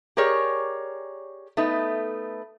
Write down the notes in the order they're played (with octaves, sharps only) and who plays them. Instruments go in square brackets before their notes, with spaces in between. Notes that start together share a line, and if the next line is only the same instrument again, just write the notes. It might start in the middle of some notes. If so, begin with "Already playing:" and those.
[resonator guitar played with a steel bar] G4 G#4 A#4 C#5 D5
A3 B3 D#4 B4